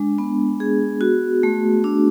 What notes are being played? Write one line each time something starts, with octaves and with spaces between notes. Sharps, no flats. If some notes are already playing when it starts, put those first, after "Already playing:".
Already playing: G#3 D4
B3
G#4
F#4
A3
D4